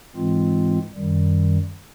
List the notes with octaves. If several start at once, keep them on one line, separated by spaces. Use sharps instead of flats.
G#2 E3 G#3 C4 F4
F#2 D#3 G3